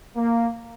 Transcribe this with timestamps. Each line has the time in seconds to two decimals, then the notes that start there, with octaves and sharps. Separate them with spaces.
0.17 A#3